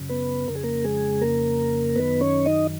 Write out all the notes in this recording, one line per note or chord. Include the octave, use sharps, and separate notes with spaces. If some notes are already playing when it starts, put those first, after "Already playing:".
Already playing: F#2 C#3
B3 B4
F2 C#3 A#4
G#4
A#3 A#4
G#3 G#4
A#3 A#4
F#2 D#3 B3 B4
C#4 C#5
D#4 D#5